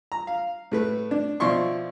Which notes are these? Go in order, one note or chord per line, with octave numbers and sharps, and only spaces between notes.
A#5
F5
A2 A3 B4
D4
B2 F3 E4 D5 C6 C#6